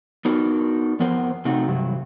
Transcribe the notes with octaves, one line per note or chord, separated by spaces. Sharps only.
B3 D4 D#4 F#4 A#4
F2 F3 B3 A#4 C5
C3 A3 D#4 F#4
G2 C3 F#3